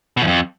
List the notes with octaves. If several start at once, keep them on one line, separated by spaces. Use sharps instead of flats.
B2
E2
F2